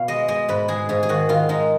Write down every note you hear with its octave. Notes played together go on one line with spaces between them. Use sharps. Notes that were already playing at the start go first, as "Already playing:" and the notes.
Already playing: B2 F5
G#3 D#5
G#3 D#5
G#2 B4
G#3 G#4
G#2 G#4
G#4
D#3 F#4
D#3 F4
G#3 D#4